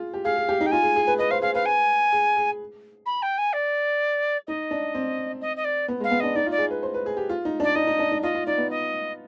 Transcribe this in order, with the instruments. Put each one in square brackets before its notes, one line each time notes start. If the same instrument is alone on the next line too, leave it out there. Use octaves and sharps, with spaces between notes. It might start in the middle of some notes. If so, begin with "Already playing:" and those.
Already playing: [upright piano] F4 G#4
G4
[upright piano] G#4 [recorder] F5
[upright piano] G#4
G4
D#4
[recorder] G5
[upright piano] F4 [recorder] G#5
[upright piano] G#4
G#4
B4
[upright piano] B4 [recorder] D#5
[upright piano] C5 [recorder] F5
[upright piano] G#4 [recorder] F5
[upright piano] B4 [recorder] F5
[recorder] G#5
[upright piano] G#4
G#4
[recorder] B5
G5
G#5
D5
[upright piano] D#4 [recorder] D#5
[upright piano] D4
C4
[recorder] D#5
D#5
D5
[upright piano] B3
[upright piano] G#3 [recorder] F5
[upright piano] B3
[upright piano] D4 [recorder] D#5
[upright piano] D#4 [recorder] D5
[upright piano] F4 [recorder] D5
[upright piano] G#4
B4
C5
B4
G#4
G4
F4
D#4
[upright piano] D4 [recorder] D5
[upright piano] D#4 [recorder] D#5
[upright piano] D#4
D4
D#4
[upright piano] F4 [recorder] D#5
[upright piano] F4
[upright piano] D#4 [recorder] D5
[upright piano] B3
[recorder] D#5